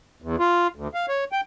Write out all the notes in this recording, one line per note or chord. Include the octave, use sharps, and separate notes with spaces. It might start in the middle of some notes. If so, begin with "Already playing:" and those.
E2
F4
D2
F5
C#5
G5